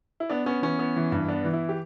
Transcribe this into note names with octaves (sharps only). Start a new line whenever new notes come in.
E4
B3 D4
B3 C#4
E3 C#4
B3
E3
G2
B3 D4
E3
E4
G4